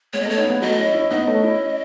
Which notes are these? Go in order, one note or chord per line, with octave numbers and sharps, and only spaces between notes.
G#3 B3 C#5
D#5
A3 C#4
C#5
B3 D#4
G#3 B3
F#3 A3 D#5
C#4 E4
C#4 E4
B3 D#4 D#5
A3 C#4
C#4 E4